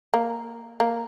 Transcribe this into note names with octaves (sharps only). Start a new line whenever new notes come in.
A#3
A#3